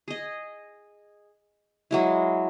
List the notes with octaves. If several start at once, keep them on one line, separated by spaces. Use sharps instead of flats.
G#4 D#5
F#3 G#3 E4